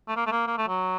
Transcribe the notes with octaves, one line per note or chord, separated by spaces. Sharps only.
A3
A#3
A3
A#3
A#3
A3
F#3